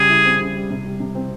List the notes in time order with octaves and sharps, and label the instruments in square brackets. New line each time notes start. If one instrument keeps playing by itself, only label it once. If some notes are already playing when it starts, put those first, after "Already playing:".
Already playing: [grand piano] C#3 G3 [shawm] G#4
[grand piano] E4
C4
C#3
G3
C3
G3
C3
C4